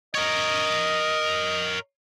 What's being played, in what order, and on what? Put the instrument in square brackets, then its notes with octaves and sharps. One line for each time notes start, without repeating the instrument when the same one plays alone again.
[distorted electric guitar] A#4 C#5 [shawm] D#5